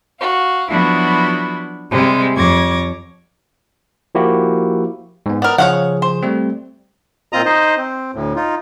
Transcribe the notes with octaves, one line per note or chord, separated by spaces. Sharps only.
F#4 F5
F3 F#3 B3 D4 E4 F#4
C3 G3 G#3 C5
F2 C#5 D6 G#6 A#6
F3 A#3 E4 F#4 G4
G#2 B3
B3 A#4 D5 F6
C#3 F3 G#4 C#5 F5 F#5
C5
G3 A3 C4
A#2 C4 F4 D#5 A#5 D#6
D#4 C5 D#5
C4
D2 A2
D#4 F4